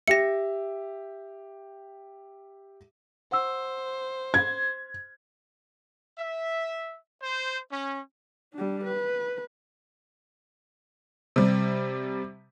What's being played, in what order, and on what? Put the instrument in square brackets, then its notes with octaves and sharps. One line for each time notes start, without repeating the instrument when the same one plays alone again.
[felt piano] G4 E5 [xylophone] A#6 C#7
[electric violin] C5 [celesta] F#5 E6
[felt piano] G#6
[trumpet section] E5
C5
C#4
[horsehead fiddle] G3 D4
B4
[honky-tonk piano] C3 G3